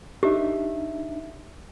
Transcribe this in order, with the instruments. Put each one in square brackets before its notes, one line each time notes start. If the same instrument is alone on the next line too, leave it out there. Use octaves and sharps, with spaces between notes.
[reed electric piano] D4 D#4 E5 [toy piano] G4